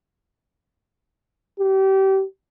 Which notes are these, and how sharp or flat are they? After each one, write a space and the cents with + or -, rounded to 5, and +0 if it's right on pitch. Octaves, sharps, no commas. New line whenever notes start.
G4 -30